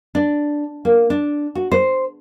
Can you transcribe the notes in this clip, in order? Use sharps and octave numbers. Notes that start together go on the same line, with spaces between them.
D4
A#3
D4
F#4
C5